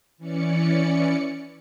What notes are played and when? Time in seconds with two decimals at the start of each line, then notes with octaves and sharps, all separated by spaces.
0.18 E3 C#4 D5 C#7